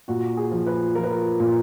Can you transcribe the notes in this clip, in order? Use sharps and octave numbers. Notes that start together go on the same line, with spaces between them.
A#2 F#4
G#4
F3
B4
F3 A#4
B4
A#4
A#2